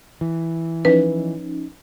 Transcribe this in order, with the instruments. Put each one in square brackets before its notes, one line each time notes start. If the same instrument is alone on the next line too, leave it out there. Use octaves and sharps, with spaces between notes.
[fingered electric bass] E3
[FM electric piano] F3 C#4 D#4 [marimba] B4